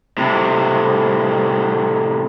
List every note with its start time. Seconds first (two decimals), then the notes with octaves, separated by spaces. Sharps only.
0.18 A2 C3